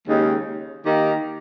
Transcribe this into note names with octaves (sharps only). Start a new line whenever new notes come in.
D#2 C#3 G#3 D#4 G4
D#3 A#3 D#4 G4 A#4